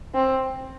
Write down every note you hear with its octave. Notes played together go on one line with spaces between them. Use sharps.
C4